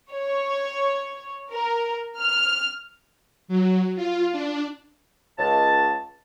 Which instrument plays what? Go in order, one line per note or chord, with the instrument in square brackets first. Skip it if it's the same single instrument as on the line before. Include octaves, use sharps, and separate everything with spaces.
[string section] C#5
A#4
F6
[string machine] F#3
F4
D4
[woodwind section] C#2 A5